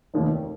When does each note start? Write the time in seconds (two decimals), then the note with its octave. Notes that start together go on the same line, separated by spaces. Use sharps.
0.14 F1 D#2 D#3